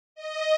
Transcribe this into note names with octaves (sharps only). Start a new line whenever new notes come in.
D#5